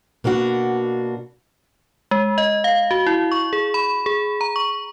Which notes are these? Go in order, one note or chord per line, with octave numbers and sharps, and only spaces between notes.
B2 A#3 D4 F#4
G#3
D#5
F5
F#4
E4
C#6
G#4
B5
G#4
A#5
C#6